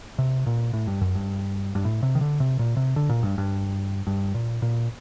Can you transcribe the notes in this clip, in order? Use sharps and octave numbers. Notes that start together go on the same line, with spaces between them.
C3
A#2
A2
G2
F#2
G2
G2
A2
C3
D#3
D3
C3
A#2
C3
D3
A#2
G2
G2
G2
A#2
A#2